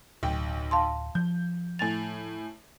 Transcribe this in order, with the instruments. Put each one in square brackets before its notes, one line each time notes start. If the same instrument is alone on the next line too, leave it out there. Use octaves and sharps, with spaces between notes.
[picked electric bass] D1 [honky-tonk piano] B1 G5
[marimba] F5 A5 C6
[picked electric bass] F3 [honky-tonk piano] G6
[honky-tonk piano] A2 G#5 F7 [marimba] A6